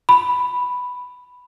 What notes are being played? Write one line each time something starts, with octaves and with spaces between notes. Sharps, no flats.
B5